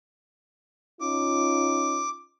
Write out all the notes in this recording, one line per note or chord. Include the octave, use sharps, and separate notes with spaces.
C#4 D#4 F4 D6